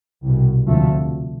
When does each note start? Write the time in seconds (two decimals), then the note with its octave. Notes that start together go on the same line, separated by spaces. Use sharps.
0.24 C2 B2
0.67 D2 C3 F3 A3